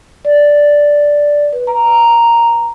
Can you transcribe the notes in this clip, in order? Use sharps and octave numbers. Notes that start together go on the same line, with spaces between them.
D5
B4
A#5